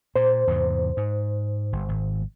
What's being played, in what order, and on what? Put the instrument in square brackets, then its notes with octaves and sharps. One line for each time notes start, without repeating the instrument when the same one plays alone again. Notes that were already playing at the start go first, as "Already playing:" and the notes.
[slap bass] A#2 [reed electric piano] C5
[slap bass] E2 G#2 C3
G#2
G1
G#1